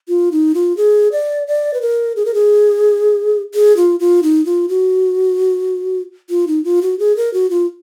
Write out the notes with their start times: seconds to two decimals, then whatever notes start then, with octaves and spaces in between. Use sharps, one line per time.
0.08 F4
0.32 D#4
0.55 F4
0.77 G#4
1.12 D5
1.47 D5
1.74 B4
1.82 A#4
2.16 G#4
2.25 A#4
2.34 G#4
3.54 G#4
3.77 F4
4.00 F4
4.23 D#4
4.46 F4
4.69 F#4
6.30 F4
6.47 D#4
6.64 F4
6.82 F#4
6.99 G#4
7.17 A#4
7.34 F#4
7.50 F4